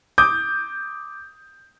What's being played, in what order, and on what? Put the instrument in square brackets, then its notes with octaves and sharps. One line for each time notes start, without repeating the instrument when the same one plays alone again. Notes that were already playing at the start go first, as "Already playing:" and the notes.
[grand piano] D6 D#6 G6